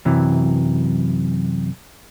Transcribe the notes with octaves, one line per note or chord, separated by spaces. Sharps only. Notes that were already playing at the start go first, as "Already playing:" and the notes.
F#2 C3 E3 F#3